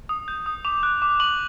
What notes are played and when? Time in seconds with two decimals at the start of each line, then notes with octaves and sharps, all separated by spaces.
0.09 D#6
0.28 G6
0.46 D#6
0.65 D6 F7
0.83 F#6
1.02 D6
1.20 C#6 F#7